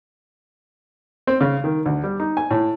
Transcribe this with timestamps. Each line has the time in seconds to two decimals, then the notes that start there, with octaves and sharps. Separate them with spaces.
1.27 C4
1.41 C#3
1.64 D#3
1.86 D2
2.04 G3
2.20 D#4
2.37 G#5
2.51 A2